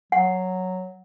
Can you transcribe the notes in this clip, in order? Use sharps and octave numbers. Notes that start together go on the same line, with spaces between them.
F#3 F#5